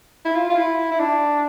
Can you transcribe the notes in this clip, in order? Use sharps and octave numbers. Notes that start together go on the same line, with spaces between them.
E4
F4
F4
E4
E4
D4